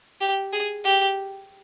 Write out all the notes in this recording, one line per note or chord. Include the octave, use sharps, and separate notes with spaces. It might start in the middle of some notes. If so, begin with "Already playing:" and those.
G4
G#4
G4